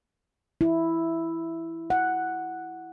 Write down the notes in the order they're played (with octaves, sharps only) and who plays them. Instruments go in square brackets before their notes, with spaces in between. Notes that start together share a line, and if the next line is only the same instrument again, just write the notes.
[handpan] E4
F#5